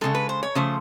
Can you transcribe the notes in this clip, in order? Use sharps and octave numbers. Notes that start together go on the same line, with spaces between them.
C#3 E3 G#3 A4
B4
C5
C#5
C#3 F3 A3 C5